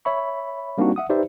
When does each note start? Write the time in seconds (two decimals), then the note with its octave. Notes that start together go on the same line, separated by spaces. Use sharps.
0.05 C#5 E5 B5 C#6
0.78 G3 A#3 C4 D4 D#4 F#4
0.96 E5 F#5 D#6
1.09 D#4 G4 B4 C5 D5 E5